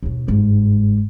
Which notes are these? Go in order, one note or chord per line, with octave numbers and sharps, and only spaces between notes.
D#2 B2
G1 G#2